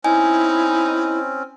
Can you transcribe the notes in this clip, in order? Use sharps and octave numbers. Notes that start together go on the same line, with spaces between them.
C4 C#4 D#4 E4 G#5